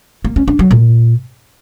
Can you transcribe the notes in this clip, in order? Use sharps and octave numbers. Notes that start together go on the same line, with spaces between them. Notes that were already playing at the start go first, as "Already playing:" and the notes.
A#3
C#4
D4
F#3
A#2